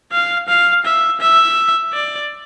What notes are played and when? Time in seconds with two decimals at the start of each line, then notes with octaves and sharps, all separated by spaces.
0.12 F5
0.48 F5
0.85 E5
1.21 E5
1.93 D5